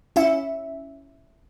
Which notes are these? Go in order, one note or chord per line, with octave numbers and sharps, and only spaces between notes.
C#4 E4 E5